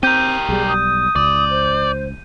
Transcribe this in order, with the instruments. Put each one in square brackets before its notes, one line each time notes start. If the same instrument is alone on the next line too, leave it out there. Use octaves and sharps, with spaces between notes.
[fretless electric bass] C4 [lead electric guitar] G4 A#4 [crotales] G6 D#7
[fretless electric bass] B1 G3 [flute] G#4
[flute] D#6
[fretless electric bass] C#2 [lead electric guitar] D5
[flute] C5